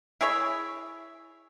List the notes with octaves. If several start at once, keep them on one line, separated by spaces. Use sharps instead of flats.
E4 G#4 C#5 E5